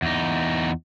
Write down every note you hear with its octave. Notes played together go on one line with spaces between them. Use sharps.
E2 D#4